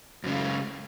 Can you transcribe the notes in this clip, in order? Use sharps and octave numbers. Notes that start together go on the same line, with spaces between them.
F#2 C#3 G#3